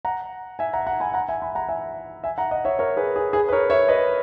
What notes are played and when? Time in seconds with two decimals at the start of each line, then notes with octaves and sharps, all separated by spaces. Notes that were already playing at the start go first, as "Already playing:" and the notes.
0.05 F#5 A#5
0.59 E5 G#5
0.73 F#5 A#5
0.87 F#5 A#5
1.00 G#5 B5
1.14 F#5 A#5
1.29 E5 G#5
1.42 G#5 B5
1.55 F#5 A#5
1.69 E5 G#5
2.24 E5 G#5
2.38 F#5 A#5
2.51 D#5 F#5
2.65 C#5 E5
2.79 A#4 C#5
2.97 G#4 B4
3.16 G#4
3.33 G#4 B4
3.49 B4
3.52 A#4 C#5
3.70 C#5 E5
3.88 B4 D#5